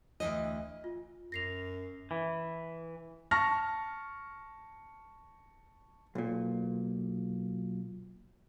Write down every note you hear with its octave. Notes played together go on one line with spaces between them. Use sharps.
D2 C#3 E3 D#5
F4
F#2 A#6 C7 F7
E3
A5 C#6 F6 A#6
B1 A#2